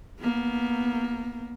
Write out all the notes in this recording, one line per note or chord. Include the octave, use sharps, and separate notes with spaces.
A#3 B3